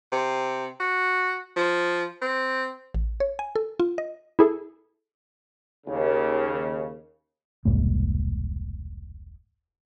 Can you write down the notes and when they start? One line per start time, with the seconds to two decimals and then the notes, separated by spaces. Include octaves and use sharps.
0.12 C3
0.80 F#4
1.57 F3
2.22 C4
2.94 A1
3.20 C#5
3.39 G#5
3.56 A4
3.80 F4
3.98 D#5
4.39 E4 G#4 A4
5.87 D#2 C#3
7.65 E1 C2 G#2 A#3